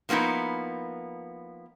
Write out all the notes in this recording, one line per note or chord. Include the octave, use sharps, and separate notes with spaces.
F3 A#3 B3 D#4 E4